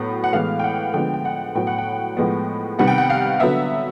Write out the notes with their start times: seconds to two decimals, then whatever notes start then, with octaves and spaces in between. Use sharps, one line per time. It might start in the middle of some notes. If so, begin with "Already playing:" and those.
Already playing: A2 F#3 B3
0.24 F#5
0.32 A2 E3 G#3 B3 F5
0.59 G5
0.64 F#5
0.94 D3 F3 G#3 B3 G5
1.14 G5
1.25 F#5
1.55 A2 F#3 B3 G5
1.67 F#5
1.78 G5
2.17 A2 F3 G#3 B3
2.79 C3 D#3 G3 B3 F#5
2.88 G5
2.98 F#5
3.10 F5
3.40 D3 F#3 B3 E5